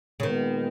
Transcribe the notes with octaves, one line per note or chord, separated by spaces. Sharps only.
C#3
A#2 D#3 G#3 B3